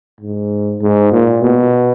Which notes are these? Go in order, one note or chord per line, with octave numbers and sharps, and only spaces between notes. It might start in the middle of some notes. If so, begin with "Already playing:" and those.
G#2
G#2
A#2
B2